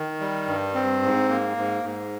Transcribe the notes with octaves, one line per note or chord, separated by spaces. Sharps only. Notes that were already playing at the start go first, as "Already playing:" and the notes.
Already playing: D#3
G3
G2
C4
G#2
A#3
G#2
G#2